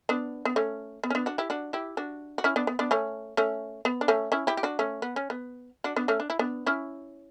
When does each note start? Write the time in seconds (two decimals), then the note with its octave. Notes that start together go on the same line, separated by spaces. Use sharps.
0.09 B3 D4
0.45 B3
0.56 A3 C#4
1.04 B3
1.10 C#4
1.15 B3 D4
1.26 D4 F#4
1.38 E4 G4
1.50 D4 F#4
1.73 E4 G4
1.97 D4 F#4
2.38 F#4
2.44 C#4 E4
2.56 B3 D4
2.67 B3
2.79 B3 D4
2.91 A3 C#4
3.37 A3 C#4
3.85 B3
4.01 D4
4.08 A3 C#4
4.32 C#4 E4
4.47 E4 G4
4.57 G4
4.63 D4 F#4
4.79 A3 C#4
5.02 B3
5.16 C#4
5.30 B3
5.84 D4 F#4
5.96 B3 D4
6.08 A3 C#4
6.20 D4
6.30 E4
6.39 B3 D4
6.66 C#4 E4